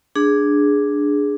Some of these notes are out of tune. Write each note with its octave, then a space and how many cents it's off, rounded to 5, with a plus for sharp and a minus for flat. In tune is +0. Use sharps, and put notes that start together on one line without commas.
D4 +0 G#4 +0